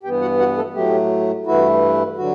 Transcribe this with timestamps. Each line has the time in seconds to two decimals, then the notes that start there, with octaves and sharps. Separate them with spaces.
0.03 G2 E3 B3 G4 G5
0.21 F#4 F#5
0.39 F#4 F#5
0.57 A3 A4
0.74 A2 F#3 A3 G4
1.46 G2 E3 A3 E4 F#4
2.17 D3 F#3 F#4